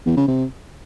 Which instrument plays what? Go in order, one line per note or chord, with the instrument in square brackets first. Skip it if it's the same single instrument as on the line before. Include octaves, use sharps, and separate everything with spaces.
[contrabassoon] E2
C#3
C3